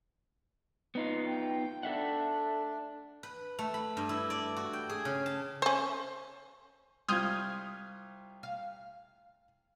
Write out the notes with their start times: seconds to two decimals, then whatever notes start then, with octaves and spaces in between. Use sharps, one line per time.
0.95 B3 D#4 F4
1.27 G5
1.83 D4 A4 E5 F#5
3.23 B4
3.59 A3
3.74 B5
3.97 G2
4.09 E4
4.30 D5
4.57 F#4
4.73 G5
4.90 G#4
5.05 C#3
5.26 A5
5.62 C#4 C5
7.08 C2 F4 C6 D#6 F6 G6 G#6
8.43 F5